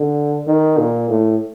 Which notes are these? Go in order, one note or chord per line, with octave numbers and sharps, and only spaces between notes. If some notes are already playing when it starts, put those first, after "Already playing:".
Already playing: D3
D#3
A#2
A2